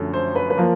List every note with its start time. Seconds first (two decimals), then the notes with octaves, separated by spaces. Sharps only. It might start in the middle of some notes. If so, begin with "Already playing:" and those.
Already playing: F#2 D3 F3 A3
0.14 C5
0.36 B4
0.50 B4
0.58 F3 A#3 A#4